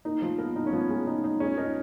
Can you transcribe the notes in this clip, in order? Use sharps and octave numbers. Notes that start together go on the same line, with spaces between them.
A#3 D#4
F3
B3 A#4
D#4
C#4
F3 B3
G#3
D#4
D#4
G#3 C#4
D#4 A#4